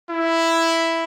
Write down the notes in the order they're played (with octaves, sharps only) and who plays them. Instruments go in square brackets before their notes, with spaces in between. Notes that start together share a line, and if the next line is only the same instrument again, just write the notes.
[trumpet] E4